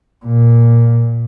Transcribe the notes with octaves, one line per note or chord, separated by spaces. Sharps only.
A#2